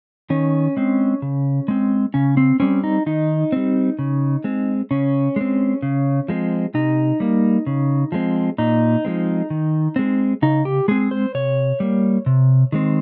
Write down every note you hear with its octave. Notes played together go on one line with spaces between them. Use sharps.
D#3 C#4
G#3 C4
C#3
G#3 C4
C#3 C#4
C4
G3 C4 C#4
D#4
D#3 D#4
G3 C4
C#3
G#3 C4
C#3 C#4
G#3 C4
C#3
F3 G#3 C4
C3 D#4
G3 A#3
C#3
F3 G#3 C4
A#2 D#4
F3 G#3 C4
D#3
G#3 C4
C#3 D#4
G4
G#3 C4 G#4
C5
C3 C#5
G3 A#3
C3
D#3 G#3 C4